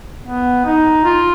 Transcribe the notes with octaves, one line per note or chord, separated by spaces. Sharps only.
B3
D#4
F4